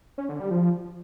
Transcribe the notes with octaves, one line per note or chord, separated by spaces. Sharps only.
C#4
D3
G3
F3